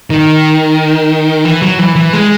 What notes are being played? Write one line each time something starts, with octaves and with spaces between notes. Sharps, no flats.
D#3
E3
F#3
E3
E3
G#3